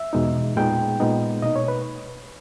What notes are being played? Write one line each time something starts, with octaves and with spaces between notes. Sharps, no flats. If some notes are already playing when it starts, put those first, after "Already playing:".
Already playing: E5
E2 B2 G#3 D#4
A#2 G#3 B3 D#4 G5
A#2 G#3 B3 D#4
B2 A#3 D#4 D#5
C#5
B4